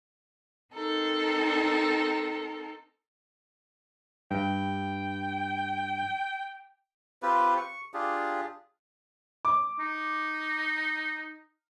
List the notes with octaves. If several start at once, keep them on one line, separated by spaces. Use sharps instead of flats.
C4 D#4 A4 A#4
G2 G5
C4 F4 G4 B4
C#6
D4 F4 G4 G#4
D6
D#4